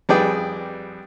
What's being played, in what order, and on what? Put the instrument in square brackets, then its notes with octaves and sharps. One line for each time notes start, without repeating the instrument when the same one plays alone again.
[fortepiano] F2 G3 G#4 B4 D5 G5